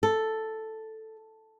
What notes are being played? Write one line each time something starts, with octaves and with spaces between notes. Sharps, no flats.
A4